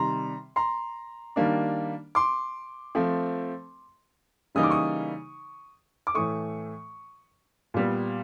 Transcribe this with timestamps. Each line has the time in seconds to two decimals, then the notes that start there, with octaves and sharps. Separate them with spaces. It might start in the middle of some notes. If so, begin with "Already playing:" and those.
Already playing: C3 D#3 G3 A#5 C6
0.56 A#5 C6
1.36 D#3 G3 A#3 D4
2.15 C6 D6
2.95 F3 A3 C4
4.55 C#3 E3 G3 A#3 D#4 D#6
4.63 D6
4.70 C#6 D#6
6.07 D6
6.14 A2 E3 A3 C#6 D#6
7.74 A#2 G3 B3